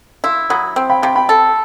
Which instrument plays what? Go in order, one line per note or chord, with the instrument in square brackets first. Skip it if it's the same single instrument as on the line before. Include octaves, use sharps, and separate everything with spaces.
[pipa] E4 [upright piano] C6 E6
[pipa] F#3 [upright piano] B5 D#6
[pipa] C4
[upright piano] G5 B5
[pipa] C3 [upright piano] G5 B5
[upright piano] G5 B5
[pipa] A4